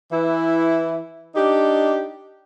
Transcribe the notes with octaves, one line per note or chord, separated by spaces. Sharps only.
E3 E4
D4 D#4 G4